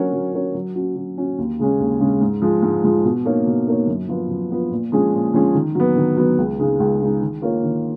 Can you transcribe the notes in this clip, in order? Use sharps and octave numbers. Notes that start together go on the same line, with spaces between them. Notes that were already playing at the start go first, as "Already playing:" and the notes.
Already playing: F#3 C#4 F#4 A#4 C#5
F#3
C#4 F#4 A#4 C#5
F#3
C#4 F#4
F#3
C#4 F#4
D#2
C#3 G#3 C#4
D#2
C#3 G#3 C#4
G#2
F3 G#3
G#2
F3 G#3
B2
A#3 D#4 A#4 C#5
B2
A#3 D#4 A#4 C#5
F#2
F3 B3 F4 B4
F#2
F3 B3 F4 B4
A#2
F3 G#3 C#4 G#4
A#2
F3 G#3 C#4 G#4
D#3
F#3 B3
D#3
F#3 B3
C#2
C#3 G#3 D#4
C#2
C#3 G#3 D#4
D#3
A#3 F4 A#4 C#5
D#3